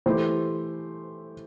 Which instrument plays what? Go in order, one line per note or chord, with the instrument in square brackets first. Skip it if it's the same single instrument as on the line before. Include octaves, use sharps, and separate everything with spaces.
[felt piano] E3 A3 E4 G4 [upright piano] C5